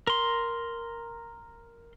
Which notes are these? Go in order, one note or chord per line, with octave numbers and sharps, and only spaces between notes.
A#4 C6